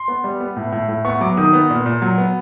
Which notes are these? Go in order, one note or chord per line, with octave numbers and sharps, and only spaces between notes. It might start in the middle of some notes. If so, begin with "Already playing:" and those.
Already playing: C6
B3
G3
B3
A2
A2
A2
B3 C#6
F#3 D6
D#3 D#6
B3
A#2
A#2
F#3
B3